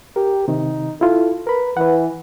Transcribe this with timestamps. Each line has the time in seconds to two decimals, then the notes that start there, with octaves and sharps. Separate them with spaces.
0.16 G4 A#4
0.48 C3 D#3 D#4
1.01 E4 F4 A4
1.47 A#4 B4 B5
1.77 E3 B4 F#5